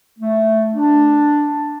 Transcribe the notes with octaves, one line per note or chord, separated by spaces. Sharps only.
A3
D4